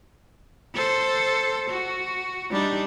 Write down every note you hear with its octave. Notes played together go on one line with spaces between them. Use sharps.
A4 C5
F#4
G3 D4 D#4